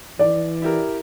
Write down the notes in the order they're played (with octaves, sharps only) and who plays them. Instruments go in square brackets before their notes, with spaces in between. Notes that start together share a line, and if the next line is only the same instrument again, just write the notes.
[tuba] E3 [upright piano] D5
[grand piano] E4 G4 A#4